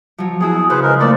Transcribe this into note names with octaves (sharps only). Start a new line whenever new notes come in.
F3 F#3
B3 E4 F#4 G#4
C#3 G#4 B4 C5
G#3 A#4
F3 A3 A#3 D4 D5